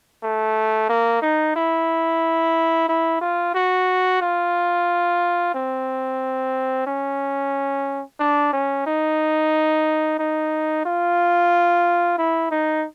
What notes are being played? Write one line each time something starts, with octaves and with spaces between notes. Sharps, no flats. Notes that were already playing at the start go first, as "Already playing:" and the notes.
A3
A#3
D#4
E4
E4
F4
F#4
F4
C4
C#4
D4
C#4
D#4
D#4
F4
E4
D#4